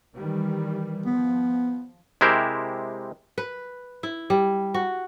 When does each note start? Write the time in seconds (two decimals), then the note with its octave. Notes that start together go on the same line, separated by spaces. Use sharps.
0.14 D#3 E3 G3
1.06 F3 B3
2.21 C3 G#3 E4 G4 A#4 C5
3.38 B4
4.03 E4
4.30 G3
4.74 F#4